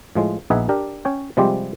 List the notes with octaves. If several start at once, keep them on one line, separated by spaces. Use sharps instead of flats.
A2 F3 G#3
A#1 B3 D#4 G#4 E5 F#5
D4 G4 A#4
C#4 C#5 G5
C3 F3 G3 G#3 C4 G4